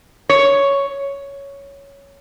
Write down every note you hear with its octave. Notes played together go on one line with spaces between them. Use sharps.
C#5